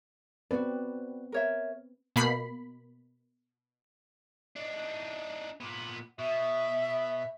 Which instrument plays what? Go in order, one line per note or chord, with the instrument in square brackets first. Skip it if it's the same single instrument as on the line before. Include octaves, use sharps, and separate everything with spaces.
[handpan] B3 C4 B4 [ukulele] F#4 D5
[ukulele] A#4 C#5 E5
[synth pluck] B2 A#3 B5 C7
[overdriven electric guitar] D4 D#4
A#2 B3
[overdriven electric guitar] B2 [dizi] E5